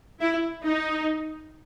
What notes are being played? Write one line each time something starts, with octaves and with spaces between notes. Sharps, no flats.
E4
D#4